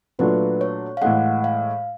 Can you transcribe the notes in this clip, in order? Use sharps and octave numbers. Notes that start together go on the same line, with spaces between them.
A#2 F#3 A3 D4 F4 B4
C#5
F5
A2 E3 G#3 F#5
F5